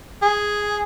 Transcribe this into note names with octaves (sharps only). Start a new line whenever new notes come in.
G#4